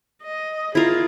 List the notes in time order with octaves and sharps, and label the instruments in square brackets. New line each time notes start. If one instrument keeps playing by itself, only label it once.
[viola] D#5
[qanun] E4 A#4 [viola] F4 G#4